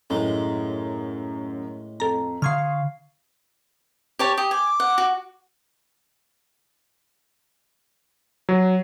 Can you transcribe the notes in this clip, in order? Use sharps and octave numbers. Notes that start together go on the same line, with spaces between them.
F#2 A2 G#3
F2 A4 A#5
D3 F5 C6 C#6 D#6 F6 G#6 C7
G4 C#5 A5
G4 D#6
G#5 D6
F#5
F#4
F#3